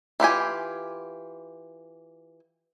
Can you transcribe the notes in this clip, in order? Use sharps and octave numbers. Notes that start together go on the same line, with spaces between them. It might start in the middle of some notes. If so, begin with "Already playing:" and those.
E3 F4 G4 G#5